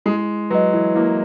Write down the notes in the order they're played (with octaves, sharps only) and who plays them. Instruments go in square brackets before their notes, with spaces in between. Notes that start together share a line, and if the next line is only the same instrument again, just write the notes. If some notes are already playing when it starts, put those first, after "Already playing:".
[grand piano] G#3 [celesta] E4
[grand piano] F#3 [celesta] B4
[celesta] D#5
[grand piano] E3
[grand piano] A#3 [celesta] E4